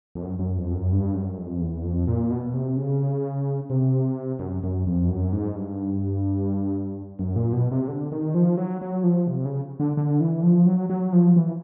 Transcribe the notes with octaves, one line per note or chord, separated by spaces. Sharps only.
F2
F#2
F#2
F2
F#2
G2
F#2
F2
E2
F2
A#2
B2
C3
C#3
C3
F#2
F#2
F2
F#2
G#2
G2
F#2
A#2
B2
C3
D3
D#3
F3
F#3
F#3
F3
C3
C#3
D3
D3
E3
F3
F#3
F#3
F3
E3